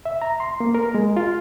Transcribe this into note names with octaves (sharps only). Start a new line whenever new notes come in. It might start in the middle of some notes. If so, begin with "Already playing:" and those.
E5
A#5
C6
A#3
A#4
G#3
F4